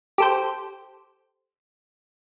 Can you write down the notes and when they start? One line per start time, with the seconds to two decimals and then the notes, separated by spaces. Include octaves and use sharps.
0.18 G4 A4 C5